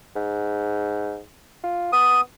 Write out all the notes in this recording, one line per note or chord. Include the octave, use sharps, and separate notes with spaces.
G#2
F4
B3 D#6